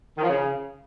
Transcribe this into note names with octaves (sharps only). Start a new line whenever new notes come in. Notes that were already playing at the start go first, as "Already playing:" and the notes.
D#3
F3
C#3